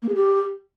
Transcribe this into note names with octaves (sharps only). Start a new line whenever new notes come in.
A#3
G#4
G4